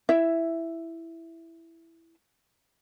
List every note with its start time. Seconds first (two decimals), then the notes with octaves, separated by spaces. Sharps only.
0.09 E4 E5